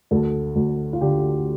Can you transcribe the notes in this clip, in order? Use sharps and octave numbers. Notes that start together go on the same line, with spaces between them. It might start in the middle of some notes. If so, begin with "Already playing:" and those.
D2 A4
D2
F4
D3 G4